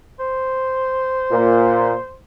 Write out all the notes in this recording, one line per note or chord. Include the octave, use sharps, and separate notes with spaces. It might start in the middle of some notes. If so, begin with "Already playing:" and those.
C5
A#2